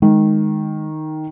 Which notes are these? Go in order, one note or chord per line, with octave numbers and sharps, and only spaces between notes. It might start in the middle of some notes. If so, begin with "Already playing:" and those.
D#3 G#3